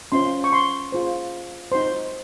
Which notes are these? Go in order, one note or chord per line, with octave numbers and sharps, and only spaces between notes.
C#4 F4 C5 C6
C#6
C6
F4 G#4 C5
D#4 F#4 C5 C6